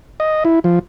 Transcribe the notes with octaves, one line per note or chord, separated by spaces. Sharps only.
D#5
E4
F3